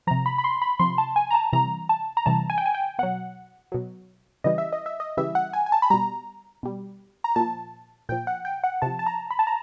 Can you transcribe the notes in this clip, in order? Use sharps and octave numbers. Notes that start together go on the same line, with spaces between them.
C3 F3 A#5
B5
B5
C6
B5
C3 F3 C6
A5
G#5
A#5
A5
C3 E3 G3 A#5
A5
A#5
C3 E3 G3 A5
G#5
G5
G#5
G5
B2 F#3 F#5
B2 F#3
C#3 E3 G3 D#5
E5
D#5
E5
D#5
C#3 E3 G3 E5
F#5
G#5
G#5
A5
B5
B2 G3 A#5
B2 G3
A#5
A#2 F3 A5
A#2 F3 G5
F#5
G5
F#5
C3 F3 A5
A5
A#5
B5
A5
A#5